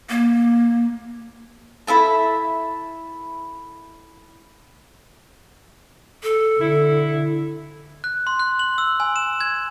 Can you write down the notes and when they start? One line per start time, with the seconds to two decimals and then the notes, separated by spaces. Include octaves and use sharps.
0.10 A#3
1.87 E4 A4 E5 A5
6.23 A4
6.60 D3 E4
8.04 F#6
8.27 C6
8.40 F#6
8.59 F#7
8.78 E6
9.00 G#5
9.16 E7
9.41 G#6